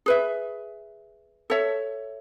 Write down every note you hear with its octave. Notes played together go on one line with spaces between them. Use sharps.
G#4 B4 E5
A4 C#5 E5